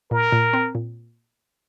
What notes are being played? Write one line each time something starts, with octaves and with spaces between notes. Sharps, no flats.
A#2 A#4
A#2
C4
A#2